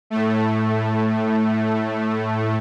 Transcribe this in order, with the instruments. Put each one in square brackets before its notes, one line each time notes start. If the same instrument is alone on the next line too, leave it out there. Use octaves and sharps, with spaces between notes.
[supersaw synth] A2 A3